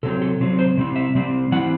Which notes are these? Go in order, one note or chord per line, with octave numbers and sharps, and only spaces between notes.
C3 F#3 C4 A4
A4
C3 F#3 C4
C5
C3 G3 C4
E5
C3 G3 C4
E3 G3 C4 F#5